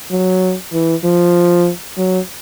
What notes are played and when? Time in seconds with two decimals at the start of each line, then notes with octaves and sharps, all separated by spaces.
0.11 F#3
0.73 E3
1.04 F3
1.98 F#3